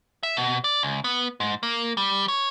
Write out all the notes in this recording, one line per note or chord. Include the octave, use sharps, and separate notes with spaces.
E5
B2
D5
C#2
B3
G#2
A#3
G3
C#5